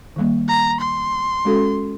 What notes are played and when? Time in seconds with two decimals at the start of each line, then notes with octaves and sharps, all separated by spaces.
0.16 D#3 G3 A#3
0.48 A#5
0.81 C6
1.45 G#3 C#4 F#4 A4